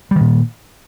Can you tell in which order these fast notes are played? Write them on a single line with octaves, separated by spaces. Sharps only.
G3 D#3 A#2